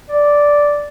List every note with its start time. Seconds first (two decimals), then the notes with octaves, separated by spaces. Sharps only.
0.09 D5